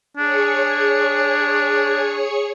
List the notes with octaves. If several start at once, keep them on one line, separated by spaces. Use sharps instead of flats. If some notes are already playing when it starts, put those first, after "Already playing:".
D4 G#4 C#5 C#7